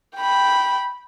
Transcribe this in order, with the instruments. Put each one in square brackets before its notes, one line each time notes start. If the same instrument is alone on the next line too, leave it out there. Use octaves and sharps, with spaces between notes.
[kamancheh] G5 B5